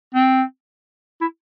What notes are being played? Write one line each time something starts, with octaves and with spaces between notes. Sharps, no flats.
C4
E4